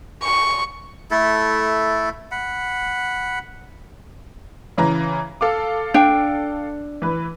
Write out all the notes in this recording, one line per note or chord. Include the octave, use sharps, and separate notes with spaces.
C#6
A3 E4 A4
F#5 B5
C#3 E3 A#5
A4 F5 D6
D4 G5
E3 B4